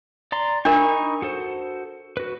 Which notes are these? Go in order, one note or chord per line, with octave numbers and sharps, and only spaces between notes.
D5 A#5 C6
D4 D#4 A#4 B5 C#6
F#4 A4 C5
F#4 B4